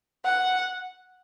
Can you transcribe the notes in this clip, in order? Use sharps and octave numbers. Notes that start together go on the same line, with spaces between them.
F#5